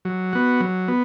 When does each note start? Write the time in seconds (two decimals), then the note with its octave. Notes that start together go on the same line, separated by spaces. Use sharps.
0.05 F#3
0.33 B3 F#4
0.61 F#3
0.88 B3